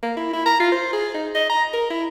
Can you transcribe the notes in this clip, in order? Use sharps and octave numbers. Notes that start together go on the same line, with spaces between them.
A#3
E4
E4
A#5
F4
C5
G#4
D#4
D#5
A#5
A#4
E4